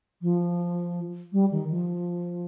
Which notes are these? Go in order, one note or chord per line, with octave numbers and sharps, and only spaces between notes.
F3
G3
D#3
F3